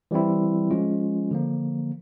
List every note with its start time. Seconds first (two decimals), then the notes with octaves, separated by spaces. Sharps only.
0.11 E3 G3 C4 E4
0.71 F3 G#3 C#4 F4
1.31 D3 F3 A#3